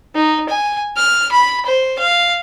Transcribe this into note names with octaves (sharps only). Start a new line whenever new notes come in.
D#4
G#5
F6
B5
C5
F5